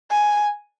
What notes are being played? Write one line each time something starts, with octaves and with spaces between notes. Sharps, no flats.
G#5